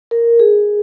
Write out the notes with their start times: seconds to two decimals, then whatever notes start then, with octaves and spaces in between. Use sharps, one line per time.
0.11 A#4
0.40 G#4